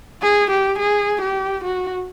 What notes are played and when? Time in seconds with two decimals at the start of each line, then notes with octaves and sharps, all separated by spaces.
0.22 G#4
0.51 G4
0.78 G#4
1.22 G4
1.64 F#4